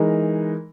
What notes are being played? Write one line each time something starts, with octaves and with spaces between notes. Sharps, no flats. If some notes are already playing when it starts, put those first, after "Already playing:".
Already playing: E3 G#3 D#4 A#4